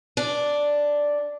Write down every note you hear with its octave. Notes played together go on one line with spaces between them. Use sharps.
D4